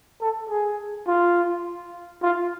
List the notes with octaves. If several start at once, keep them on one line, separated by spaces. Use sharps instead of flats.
A4
G#4
F4
F4